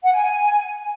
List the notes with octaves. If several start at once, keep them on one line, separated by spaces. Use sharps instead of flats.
F#5
G#5